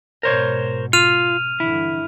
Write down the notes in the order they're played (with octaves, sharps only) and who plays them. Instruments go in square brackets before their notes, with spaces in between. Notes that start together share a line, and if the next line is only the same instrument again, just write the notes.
[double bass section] G#2 B2 [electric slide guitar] A#4 C5 C#5
[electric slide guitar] F4 [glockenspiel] F6 D#7 F7
[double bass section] G2 D3 E3 [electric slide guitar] E4